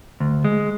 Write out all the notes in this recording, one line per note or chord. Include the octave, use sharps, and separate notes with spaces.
D2
G#3